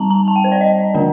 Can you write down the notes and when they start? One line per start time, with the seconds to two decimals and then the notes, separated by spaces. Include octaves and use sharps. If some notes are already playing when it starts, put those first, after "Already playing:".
Already playing: G3 C4 D#4 A5 A#5
0.11 A#5
0.28 A5
0.36 G5
0.44 C5
0.52 D5
0.61 D#5
0.94 D3 F3 A#3 D4